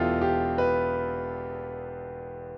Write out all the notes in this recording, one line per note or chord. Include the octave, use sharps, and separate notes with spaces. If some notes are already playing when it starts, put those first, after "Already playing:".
Already playing: E1 E2 B2 E4 F4 G4 A4
G4
B4